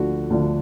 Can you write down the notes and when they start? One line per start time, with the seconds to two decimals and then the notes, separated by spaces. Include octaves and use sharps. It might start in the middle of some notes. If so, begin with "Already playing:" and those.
Already playing: D2 D3 F3 F#4
0.30 D2 D3 F3